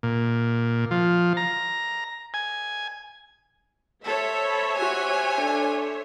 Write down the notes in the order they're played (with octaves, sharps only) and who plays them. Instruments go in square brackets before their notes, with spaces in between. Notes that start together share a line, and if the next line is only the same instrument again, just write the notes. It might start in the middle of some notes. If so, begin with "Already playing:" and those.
[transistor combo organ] A#2
F3
A#5
G#5
[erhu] A4 [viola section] C5 C#5 E5
[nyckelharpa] B5
[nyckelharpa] F#4 G4 [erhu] G#5
[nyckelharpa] D4 A4